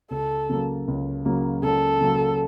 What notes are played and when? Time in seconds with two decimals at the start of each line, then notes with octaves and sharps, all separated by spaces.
0.11 C#2 A4
0.49 C#3 F#3 A#3
0.88 C#2
1.25 C#3 F#3 A#3
1.63 C#2 A4
2.01 C#3 F#3 A#3